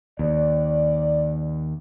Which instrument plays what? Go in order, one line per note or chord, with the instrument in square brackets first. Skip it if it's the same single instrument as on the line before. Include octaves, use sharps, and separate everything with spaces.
[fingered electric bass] D#2 [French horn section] D5